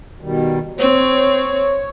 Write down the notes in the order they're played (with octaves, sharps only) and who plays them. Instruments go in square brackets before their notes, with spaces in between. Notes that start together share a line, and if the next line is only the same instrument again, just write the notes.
[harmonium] B2 D#3 G3
[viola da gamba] C4 [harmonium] C#5